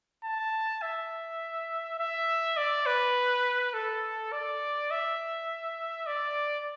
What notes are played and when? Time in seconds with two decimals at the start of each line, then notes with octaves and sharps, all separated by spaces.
0.24 A5
0.82 E5
1.99 E5
2.57 D5
2.86 B4
3.74 A4
4.32 D5
4.91 E5
6.07 D5